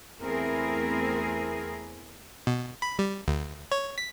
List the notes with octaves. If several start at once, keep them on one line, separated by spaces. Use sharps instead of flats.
E2 A3 C4 E4 G#4 A#4
B2
B5
G3
D2
C#5
B6